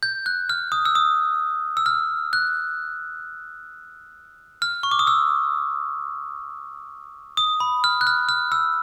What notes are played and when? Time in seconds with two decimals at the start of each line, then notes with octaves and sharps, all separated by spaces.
0.03 G6
0.26 F#6
0.49 F6
0.72 D#6
0.85 E6
0.95 D#6
1.77 E6
1.86 F6
2.33 F#6
4.62 F6
4.83 C#6
4.91 D6
4.99 D#6
5.07 E6
7.37 D#6
7.60 B5
7.84 F6
8.01 F#6
8.07 F6
8.29 F6
8.52 E6